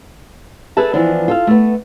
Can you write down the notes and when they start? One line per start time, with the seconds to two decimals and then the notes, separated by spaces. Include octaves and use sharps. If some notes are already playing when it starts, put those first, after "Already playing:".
0.77 G#4 A4 B4 E5 A5
0.94 E3 F3 B3 D4
1.28 F4 A4 F5
1.47 A3 B3